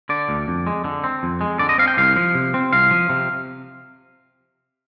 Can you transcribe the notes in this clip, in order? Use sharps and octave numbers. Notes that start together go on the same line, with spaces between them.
D3 D5
D2
F2
G#3
D3
C4
F2
G#3
D3 D5
D#5
C4 F5
G5
C2 F5
F3
C3
C4
C2 F5
F3
C3